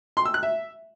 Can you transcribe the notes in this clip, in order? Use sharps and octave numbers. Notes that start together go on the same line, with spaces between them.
C6
E6
F#6
E5